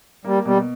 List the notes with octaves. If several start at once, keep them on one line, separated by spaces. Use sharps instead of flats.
G3 A#3
B2 G3